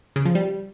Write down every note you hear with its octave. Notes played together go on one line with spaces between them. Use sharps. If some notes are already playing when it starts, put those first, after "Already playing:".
C#3
F3
G3